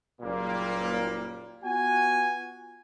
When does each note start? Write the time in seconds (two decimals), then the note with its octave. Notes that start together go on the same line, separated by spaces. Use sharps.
0.22 F#1 A#2 G3 A#3
1.64 B3 F4 F#4 F#5 G#5